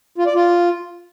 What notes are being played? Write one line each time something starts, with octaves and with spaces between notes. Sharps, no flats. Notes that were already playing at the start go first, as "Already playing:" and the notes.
F4
D5
F4